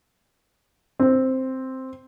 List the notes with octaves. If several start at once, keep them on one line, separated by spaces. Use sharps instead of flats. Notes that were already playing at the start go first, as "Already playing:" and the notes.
C4